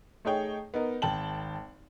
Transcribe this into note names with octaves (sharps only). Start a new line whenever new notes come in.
A3 D#4 G#4 C#5 G5
B3 D#4 A#4
G#1 G5 A5 F#7